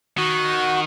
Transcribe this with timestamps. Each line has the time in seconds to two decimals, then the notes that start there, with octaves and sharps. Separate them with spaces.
0.18 D#3 F#4 F#5